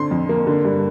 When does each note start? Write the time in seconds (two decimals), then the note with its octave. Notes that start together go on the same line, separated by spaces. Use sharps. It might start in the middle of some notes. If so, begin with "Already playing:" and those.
Already playing: D3 C4 C6
0.11 F2
0.29 A#3
0.47 D3
0.64 G2